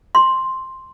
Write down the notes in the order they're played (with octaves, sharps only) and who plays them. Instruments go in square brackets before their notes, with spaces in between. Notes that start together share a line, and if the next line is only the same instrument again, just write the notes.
[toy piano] C6